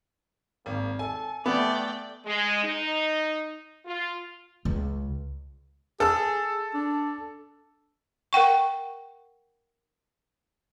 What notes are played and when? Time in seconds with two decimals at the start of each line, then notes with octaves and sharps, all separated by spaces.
0.66 G#1 A#3
0.99 A4 G#5
1.46 A3 B3 D5 G5
2.26 G#3
2.63 D#4
3.85 F4
4.65 C#2
6.00 G#4 A4 E6
6.74 D4
8.33 A#4 F#5 G5 C#6